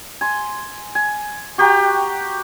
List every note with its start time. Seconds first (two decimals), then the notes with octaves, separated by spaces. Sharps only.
0.21 G#5 C6
0.95 G#5
1.58 F#4 G4 G5 A#5